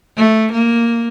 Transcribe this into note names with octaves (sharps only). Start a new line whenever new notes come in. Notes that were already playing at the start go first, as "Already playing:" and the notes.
A3
A#3